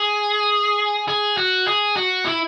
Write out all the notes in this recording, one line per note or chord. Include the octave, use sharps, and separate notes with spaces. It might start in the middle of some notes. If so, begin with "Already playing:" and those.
Already playing: G#4
G#4
F#4
G#4
F#4
E4